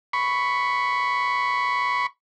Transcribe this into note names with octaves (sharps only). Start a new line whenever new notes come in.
B5 C#6